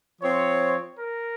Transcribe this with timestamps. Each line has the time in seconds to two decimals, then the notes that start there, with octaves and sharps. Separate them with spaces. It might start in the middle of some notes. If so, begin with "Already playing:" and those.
0.22 F3 C4 C#5
0.98 A#4